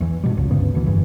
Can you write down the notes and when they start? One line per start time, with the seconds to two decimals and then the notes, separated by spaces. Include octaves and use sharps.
0.01 E2 E3
0.24 G2 B2 G3
0.35 G#1 C#2
0.51 D2 G2 C#3 B3
0.75 D2 E3
0.86 F1 G2 E3